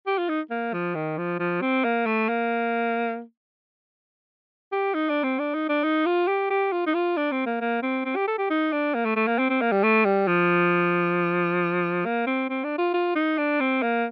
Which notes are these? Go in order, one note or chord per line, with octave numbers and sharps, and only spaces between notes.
G4
F4
D#4
A#3
F3
D#3
F3
F3
C4
A#3
A3
A#3
G4
D#4
D4
C4
D4
D#4
D4
D#4
F4
G4
G4
F4
D#4
F4
D4
C4
A#3
A#3
C4
C4
G4
A4
G4
D#4
D4
A#3
A3
A3
A#3
C4
C4
A#3
G3
A3
G3
F3
A#3
C4
C4
D4
F4
F4
D#4
D4
C4
A#3